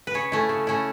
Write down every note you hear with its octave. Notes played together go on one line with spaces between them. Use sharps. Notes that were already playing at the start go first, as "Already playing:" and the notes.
B4
C#3 C#5
A3 C#4 E4
C#3
A3 C#4 E4